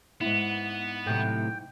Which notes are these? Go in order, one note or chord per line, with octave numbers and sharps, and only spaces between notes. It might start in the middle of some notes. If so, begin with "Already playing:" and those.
G#2 B3 E4
A2 C3 F#3 G5